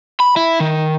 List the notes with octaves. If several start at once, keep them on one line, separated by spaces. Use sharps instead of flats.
B5
E4
D#3